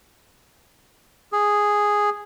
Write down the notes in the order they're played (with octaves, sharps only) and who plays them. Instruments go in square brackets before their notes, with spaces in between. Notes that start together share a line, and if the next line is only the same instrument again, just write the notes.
[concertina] G#4